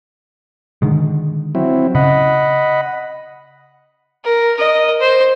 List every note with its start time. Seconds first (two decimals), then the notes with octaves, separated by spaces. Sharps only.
0.82 D3 D#3 G#3
1.55 F#3 C4 E4
1.95 C#3 D#5 F#5 B5
4.24 A#4
4.57 A#4 D#5
5.00 C5